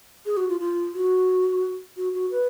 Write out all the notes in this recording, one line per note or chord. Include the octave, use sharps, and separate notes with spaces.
G#4
F#4
F4
F4
F#4
F#4
F#4
B4